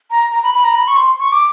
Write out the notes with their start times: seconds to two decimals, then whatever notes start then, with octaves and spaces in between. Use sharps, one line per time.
0.11 A#5
0.32 A#5
0.43 B5
0.54 B5
0.64 A#5
0.75 B5
0.88 C#6
0.97 C6
1.19 C#6
1.32 D6